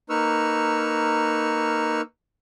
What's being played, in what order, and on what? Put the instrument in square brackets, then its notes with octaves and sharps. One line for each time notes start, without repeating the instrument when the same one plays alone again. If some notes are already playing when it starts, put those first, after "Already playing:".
[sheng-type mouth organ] A#3 D#4 B4 C#6 E6 F6